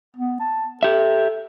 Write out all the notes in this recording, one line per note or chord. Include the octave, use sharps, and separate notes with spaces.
B3
A5
G4 A4 E5